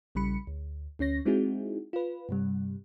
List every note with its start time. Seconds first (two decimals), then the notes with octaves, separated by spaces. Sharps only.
0.15 A#1 C#3 G3 B5 C#7
0.47 D2
0.99 D2 C#4 C#5 A#6
1.25 G#3 C4 D#4 E4 F#4 G#4
1.93 F4 B4
2.29 G2 C3 G3